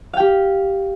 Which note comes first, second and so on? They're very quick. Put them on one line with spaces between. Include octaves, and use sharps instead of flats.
F5 G5 G4